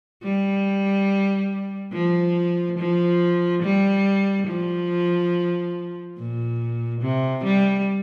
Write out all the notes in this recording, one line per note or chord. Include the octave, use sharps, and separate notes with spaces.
G3
F3
F3
G3
F3
A#2
C3
G3